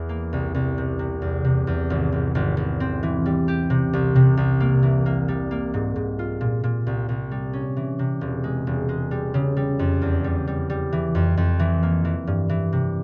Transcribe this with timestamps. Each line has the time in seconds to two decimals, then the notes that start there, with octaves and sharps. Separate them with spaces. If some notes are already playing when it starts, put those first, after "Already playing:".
Already playing: E2 E3
0.09 A#3
0.33 C2
0.54 C2
0.78 C3
0.99 C3
1.22 E2
1.44 C3
1.67 E2
1.90 G#1
2.12 G#1
2.35 G#1
2.57 G#1
2.80 C4
3.03 E3
3.26 G3
3.48 G4
3.70 C3
3.93 C2
4.15 C3
4.37 C2
4.60 A#3
4.83 E3
5.06 A#3
5.28 G3
5.51 A#3
5.74 G#2
5.96 G#2
6.19 F4
6.41 A#2
6.64 A#2
6.87 C2
7.09 C2
7.31 G3
7.53 C#4
7.77 E3
7.99 C3
8.21 E1
8.44 G#3
8.67 E1
8.89 G#3
9.11 G3
9.34 C#3
9.57 G3
9.79 F2
10.02 E2
10.24 G3
10.47 G3
10.70 G3
10.92 E3
11.15 F2
11.37 F2
11.59 E3
11.83 A#3
12.05 E3
12.27 G2
12.49 E3
12.72 C3